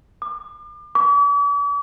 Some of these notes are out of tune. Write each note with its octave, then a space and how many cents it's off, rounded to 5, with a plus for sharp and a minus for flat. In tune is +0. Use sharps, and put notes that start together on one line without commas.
D6 +40
D6 -45